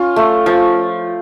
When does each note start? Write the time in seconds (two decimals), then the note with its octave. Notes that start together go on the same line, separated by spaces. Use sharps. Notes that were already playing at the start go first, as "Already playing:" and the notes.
Already playing: C#4 F4
0.16 A3
0.46 F3